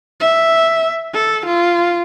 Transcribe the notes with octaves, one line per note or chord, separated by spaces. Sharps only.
E5
A4
F4